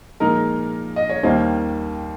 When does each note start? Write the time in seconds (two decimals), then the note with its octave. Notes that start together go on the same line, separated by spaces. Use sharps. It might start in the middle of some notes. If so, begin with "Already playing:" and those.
0.20 A#2 F3 G#3 D#4 A#4
0.96 D#5
1.10 C#5
1.23 D#2 D#3 G3 A#3 D#4 C5